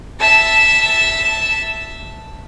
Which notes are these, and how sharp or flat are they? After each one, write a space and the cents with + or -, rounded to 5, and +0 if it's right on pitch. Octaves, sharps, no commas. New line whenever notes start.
E5 -5 A5 +0